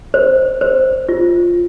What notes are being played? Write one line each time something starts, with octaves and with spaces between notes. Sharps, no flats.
C5
C5
F4